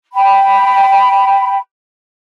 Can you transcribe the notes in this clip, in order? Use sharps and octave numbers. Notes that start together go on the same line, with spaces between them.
G5 B5